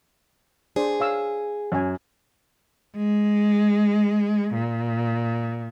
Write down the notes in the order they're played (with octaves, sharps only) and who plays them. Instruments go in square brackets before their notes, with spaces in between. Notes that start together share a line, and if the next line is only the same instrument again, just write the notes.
[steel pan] D4 C5 D5 [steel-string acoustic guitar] G#4
[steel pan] C#5 F5 E6
[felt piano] F#2 [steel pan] C#5 G#5
[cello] G#3
A#2